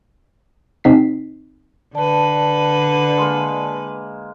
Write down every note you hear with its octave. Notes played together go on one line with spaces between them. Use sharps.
C3 C4 D#4 B6 C7
D3 B4 D5 A5
G#3 A#3